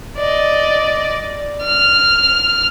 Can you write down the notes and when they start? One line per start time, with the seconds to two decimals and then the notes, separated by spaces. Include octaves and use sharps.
0.17 D5 D#5
1.63 F6